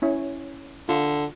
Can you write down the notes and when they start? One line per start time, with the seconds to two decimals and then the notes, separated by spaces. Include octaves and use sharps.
0.02 C#4 E4 C#5
0.89 D3 F4